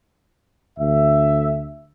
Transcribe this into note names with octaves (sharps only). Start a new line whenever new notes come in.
D2 E5